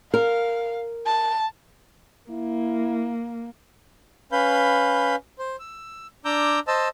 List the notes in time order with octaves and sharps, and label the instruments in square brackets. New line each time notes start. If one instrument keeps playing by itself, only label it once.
[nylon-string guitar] A#4 [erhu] F5
[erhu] A5
[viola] A#3 [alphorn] E4
[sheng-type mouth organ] C#4 B4 F5 B5 G6
C5
E6
D4 A#5 D6 E6 G6
C5 D#5 A5 E6